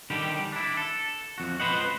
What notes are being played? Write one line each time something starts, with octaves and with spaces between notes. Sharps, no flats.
D3 D#3 G3 G4
D4 E4
A4
F2 F#4
C#2 B4 C5 D#5 F#5